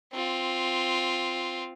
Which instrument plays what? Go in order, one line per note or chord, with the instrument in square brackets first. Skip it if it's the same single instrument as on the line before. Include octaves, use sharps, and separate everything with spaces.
[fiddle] C4 F4